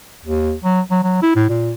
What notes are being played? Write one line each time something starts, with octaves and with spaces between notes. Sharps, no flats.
D#2
F#3
F#3
F#3
E4
A2
A#2